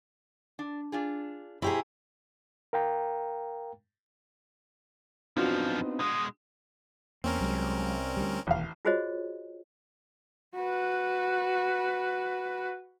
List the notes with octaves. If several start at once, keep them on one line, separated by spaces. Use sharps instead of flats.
D4
D4 F4 G#4
B2 E4 G4 G#4 C5 A#5
A#4 F5 G5 A#5
F#2 F3 B3 C4 D4 D#4 F4 F#4
B2 G#3 D#6
E2 A#3 C4 C#4 A#4
C2 F#3 G#3
D2 G3
E1 A1 D#2 F5
F4 F#4 G#4 C5 C#5 D#5
F#4 B4